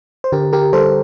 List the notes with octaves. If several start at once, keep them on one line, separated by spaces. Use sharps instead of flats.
C5
D3 G4 A#4
G4 A#4
G3 A4 C5